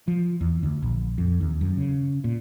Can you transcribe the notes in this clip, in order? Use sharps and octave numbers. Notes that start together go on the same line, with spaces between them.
F3
E2
D2
A#1
F2
D#2
F#2
C#3
A#2